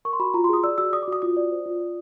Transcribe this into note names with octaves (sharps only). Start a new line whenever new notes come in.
A#4 C#6
C6
F#4 B5
F4 A#5
C6
G#4 D#6
D5 E6
F#4 E6
D5 D#6
D6
F#4 D#6
F4 D#6
D5
C5
F4
D5